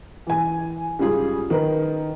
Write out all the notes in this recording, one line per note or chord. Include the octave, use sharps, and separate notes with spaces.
E3 G#5
G#2 C#3 G3 F4 G#4
D#3 D#4 A#4 B4